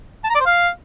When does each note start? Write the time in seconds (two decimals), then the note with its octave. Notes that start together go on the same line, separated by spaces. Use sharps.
0.24 A5
0.29 A#5
0.35 D5
0.40 C5
0.46 F5